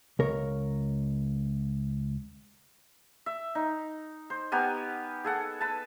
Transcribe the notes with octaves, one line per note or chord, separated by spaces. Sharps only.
C#2 A#4 C#5
E5
D#4
C5
B3 G4 A#4 G#5
G#4 A4 F#5
B4 A5